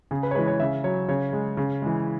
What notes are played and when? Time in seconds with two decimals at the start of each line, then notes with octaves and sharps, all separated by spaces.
0.11 C#3 G#4
0.23 B4
0.31 C#5
0.35 E3 G#3 B4
0.47 C#5
0.60 C#3 E5
0.84 F#3 C#5
1.08 C#3 C#5
1.33 G#3
1.57 C#3
1.82 E3 G#3